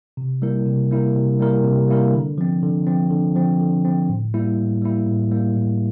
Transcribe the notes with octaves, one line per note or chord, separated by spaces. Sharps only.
C3
G3 A#3 E4 A#4
C3
G3 A#3 E4 A#4
C3
G3 A#3 E4 A#4
C3
G3 A#3 E4 A#4
D3
F3 C4
D3
F3 C4
D3
F3 C4
D3
F3 C4
A2
G3 A#3 E4
A2
G3 A#3 E4
A2
G3 A#3 E4
A2